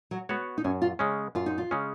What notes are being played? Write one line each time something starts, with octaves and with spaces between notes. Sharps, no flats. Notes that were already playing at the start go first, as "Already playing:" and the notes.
F#3
G#3 B3 F#4 C#5
D#4
F#2 C#4
F4
C#3 G#3 C#4
F#2 F4
D#4
F4
C#3 G#3 C#4